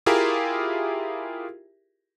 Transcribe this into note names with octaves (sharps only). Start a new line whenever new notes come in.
E4 F4 G4 G#4 A#4 E5